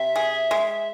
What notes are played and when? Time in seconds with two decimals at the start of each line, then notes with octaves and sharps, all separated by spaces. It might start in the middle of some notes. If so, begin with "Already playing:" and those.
Already playing: C3 E5
0.16 G#4
0.51 G#3